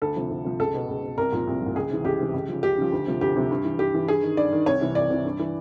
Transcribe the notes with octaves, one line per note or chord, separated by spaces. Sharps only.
D2 A4
C3 F3
D2
C3 F3
C#2 A4
B2
C#2
B2
C2 A#4
A#2 F3
C2
F3
A#2
C#2 G#4
C3 E3
C#2 G4
C3 E3
C#2
C#3 F3
C#2 G4
C#3 F3
D2
C3 F3
D2 G4
C3 F3
G2
E3
G2 G4
E3
G2 G#4
D#3
G2 D5
D#3
C2 C#5
C3 E3
C2 D5
C3 E3
G2
E3